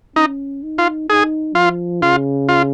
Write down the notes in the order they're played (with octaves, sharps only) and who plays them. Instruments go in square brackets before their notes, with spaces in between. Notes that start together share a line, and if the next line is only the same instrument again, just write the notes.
[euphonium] C#4 [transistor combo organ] D#4
[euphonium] D#4
[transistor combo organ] F4
[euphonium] D#4 [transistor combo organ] G#4
[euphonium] F3 [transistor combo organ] F4
[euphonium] C#3 [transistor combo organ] F4
[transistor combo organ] F4